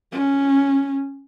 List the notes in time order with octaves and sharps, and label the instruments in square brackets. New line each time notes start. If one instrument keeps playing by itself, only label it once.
[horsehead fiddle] C#4